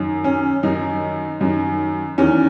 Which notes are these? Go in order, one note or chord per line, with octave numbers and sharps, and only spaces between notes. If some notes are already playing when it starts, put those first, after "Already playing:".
Already playing: F#2 D#3
C#4
F#2 D#3 D#4
F#2 D#3
E2 D#3 C#4